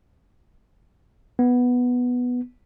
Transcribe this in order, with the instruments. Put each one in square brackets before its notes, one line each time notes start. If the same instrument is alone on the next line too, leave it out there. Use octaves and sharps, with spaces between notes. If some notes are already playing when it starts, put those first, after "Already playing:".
[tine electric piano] B3